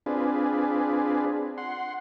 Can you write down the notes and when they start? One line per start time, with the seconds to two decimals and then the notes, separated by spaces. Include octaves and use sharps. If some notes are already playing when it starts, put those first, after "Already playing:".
0.06 C4 D4 F4 G#4 B4
1.58 F#5 C6